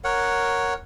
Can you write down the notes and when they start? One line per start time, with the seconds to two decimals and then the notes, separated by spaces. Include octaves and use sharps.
0.04 A#4 C#5 F#5